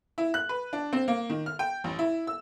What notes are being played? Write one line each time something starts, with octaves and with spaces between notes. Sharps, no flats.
E4
F#6
B4
D4
C4
A#3
D#3
F6
G5
A1
E4
E6